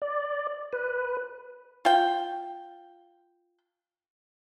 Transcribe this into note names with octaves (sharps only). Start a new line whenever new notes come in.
D5
B4
F4 G5